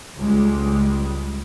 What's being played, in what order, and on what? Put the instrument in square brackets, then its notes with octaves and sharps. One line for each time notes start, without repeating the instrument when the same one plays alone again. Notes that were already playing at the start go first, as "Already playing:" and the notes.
[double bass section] C#2 G3 G#3